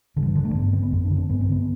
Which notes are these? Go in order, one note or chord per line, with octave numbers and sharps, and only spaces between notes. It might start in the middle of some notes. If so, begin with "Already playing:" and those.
G2 D3
E3
D3
A3
G2 B3
D3 C4
B3
F#2 C4
D4
D3
C4
G2 B3
C4
D3 B3